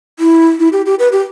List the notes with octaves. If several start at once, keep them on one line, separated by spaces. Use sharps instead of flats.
E4
E4
G4
G4
B4
G4